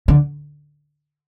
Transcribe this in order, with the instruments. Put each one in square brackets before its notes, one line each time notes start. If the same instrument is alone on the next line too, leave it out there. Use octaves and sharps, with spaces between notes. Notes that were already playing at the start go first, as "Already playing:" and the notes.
[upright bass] D3